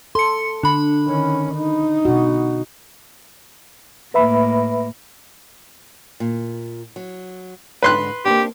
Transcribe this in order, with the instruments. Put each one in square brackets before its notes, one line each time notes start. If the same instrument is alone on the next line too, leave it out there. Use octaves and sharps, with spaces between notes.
[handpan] A4 [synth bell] C6 C#7
[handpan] D3 [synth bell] D4 B5
[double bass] D#3 C#4
D#4
[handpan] B2 F#4
[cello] A2 A#3 [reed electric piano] B4 E5 B5
[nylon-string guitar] A#2
F#3
[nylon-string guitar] G#2 D3 [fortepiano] B4 C6 F#6
[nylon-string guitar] A#3 C4 D4 [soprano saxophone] G4